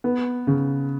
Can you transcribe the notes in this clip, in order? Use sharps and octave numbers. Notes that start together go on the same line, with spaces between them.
B3
C#3